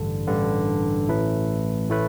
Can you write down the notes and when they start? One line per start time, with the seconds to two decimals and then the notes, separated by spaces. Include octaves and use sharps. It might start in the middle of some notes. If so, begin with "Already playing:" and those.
Already playing: A1 G2 D3
0.27 A1 G2 D3
1.08 A1 A2 A3 E4 B4
1.89 A2 A3 E4 B4